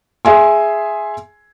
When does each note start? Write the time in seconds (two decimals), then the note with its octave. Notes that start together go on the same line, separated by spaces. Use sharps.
0.25 G#4 E5 G#5 C6